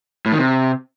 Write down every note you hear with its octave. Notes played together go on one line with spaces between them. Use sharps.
A2
D#3
C3